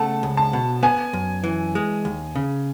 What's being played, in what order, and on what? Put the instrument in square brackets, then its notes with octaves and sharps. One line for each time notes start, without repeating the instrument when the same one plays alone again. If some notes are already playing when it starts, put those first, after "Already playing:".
Already playing: [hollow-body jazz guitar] C#3 A3 [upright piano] F#5 A5
[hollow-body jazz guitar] C#2
[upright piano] A5
[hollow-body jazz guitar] B2
[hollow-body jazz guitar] B3 [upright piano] G#5
[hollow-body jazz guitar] F#2
E3
G#3
D#2
C#3